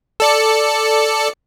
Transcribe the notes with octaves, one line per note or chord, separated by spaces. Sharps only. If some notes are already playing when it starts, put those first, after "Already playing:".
A4 D5 C#7